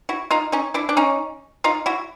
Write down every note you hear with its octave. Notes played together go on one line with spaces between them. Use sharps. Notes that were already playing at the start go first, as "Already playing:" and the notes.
E4 F#4
D#4 F4
C#4 D#4
D4 E4
D4
C#4 D#4
D#4 F4
E4 F#4